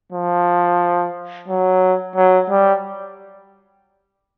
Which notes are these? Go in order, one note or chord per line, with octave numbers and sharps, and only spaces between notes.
F3
F#3
F#3
G3